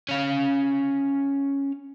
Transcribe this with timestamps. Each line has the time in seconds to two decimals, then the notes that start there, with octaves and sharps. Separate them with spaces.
0.09 C#4 F5